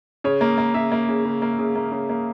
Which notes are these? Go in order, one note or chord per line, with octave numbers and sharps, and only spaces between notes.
C#3 C#5
A#3
A#3
C#3 E5
A#3
C#3
C#3
A#3
C#3
A#3
C#3
A#3